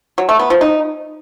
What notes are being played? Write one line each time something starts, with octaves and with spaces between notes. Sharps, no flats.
F#3
A3
B3
F3
D#4